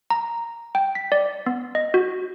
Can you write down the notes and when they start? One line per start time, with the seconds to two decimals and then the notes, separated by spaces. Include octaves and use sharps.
0.10 A#5
0.75 G5
0.95 B6
1.12 D5
1.46 B3
1.75 D#5
1.94 F#4